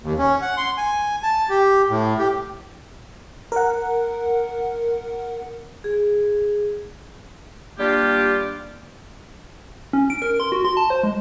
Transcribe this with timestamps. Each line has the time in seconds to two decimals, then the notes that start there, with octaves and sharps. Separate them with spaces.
0.02 D#2
0.19 C#4
0.42 F#5
0.57 C6
0.77 G#5
1.23 A5
1.50 G4
1.90 A2
2.19 G4
3.52 A#4 F#5
5.84 G#4
7.79 G3 A#3 D4 F4 G4
9.93 C#4
10.10 D7
10.22 A#4
10.40 C6
10.52 F#4
10.65 C6
10.77 A5
10.90 C5
11.03 G#3